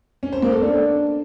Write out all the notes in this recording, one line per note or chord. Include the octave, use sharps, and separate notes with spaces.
C#4
C5
A#3
A4
D4